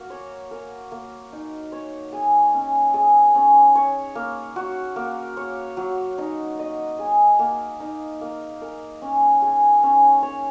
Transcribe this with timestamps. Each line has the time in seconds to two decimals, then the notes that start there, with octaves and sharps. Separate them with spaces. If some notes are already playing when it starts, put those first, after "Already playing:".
Already playing: A#3 F#4
0.10 C#5
0.51 A#4
0.92 A#3
1.33 D#4
1.72 C#5
2.13 G#4
2.54 C#4
2.94 G#4
3.35 C#4
3.75 C#5
4.15 A#3
4.56 F#4
4.96 A#3
5.37 C#5
5.77 F#3
6.18 D#4
6.59 D#5
6.99 G#4
7.39 A#3
7.80 D#4
8.21 A#3
8.61 A#4
9.02 C#4
9.42 G#4
9.83 C#4
10.22 C#5